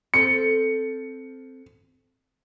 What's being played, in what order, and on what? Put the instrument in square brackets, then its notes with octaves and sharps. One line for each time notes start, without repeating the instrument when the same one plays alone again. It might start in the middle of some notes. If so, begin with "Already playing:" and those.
[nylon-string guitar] C4 A4 [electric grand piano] C#7